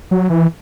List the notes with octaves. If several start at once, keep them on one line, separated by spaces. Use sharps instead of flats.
F#3
E3